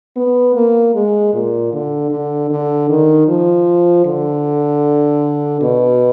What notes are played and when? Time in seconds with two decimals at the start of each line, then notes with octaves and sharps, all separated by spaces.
0.16 B3
0.55 A#3
0.95 G#3
1.33 A#2
1.73 D3
2.11 D3
2.50 D3
2.89 D#3
3.28 F3
4.05 D3
5.61 B2